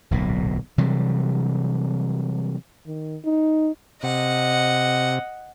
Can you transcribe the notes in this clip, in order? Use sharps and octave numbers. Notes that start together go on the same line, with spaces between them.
D1 B1 A#2
C3 E3 F#3 G3
D#3
D#4
C3 D#5 F#5